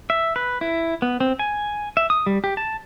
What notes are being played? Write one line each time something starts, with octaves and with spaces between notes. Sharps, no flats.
E5
B4
E4
B3
C4
G#5
E5
D#6
G3
G4
A5